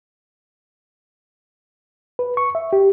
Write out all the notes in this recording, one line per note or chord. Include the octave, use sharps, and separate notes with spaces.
B4
C#6
E5
G4